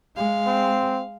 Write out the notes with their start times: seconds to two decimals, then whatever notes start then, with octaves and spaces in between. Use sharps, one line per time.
0.16 G#3 F5
0.46 C4